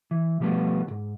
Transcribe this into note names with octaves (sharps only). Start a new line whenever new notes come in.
E3
B2 F3 G3 A3 B3
C2 G#2